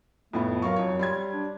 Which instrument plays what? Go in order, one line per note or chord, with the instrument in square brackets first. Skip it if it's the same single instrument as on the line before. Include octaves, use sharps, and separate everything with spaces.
[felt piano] F2 A2 B3 [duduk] A3
[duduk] F#3 [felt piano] A#4 F5 C#6
[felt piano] F2 C#5
G3 C6 G#6
[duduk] D4